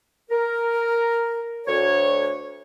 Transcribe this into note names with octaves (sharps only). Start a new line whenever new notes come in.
A#4
D2 C#5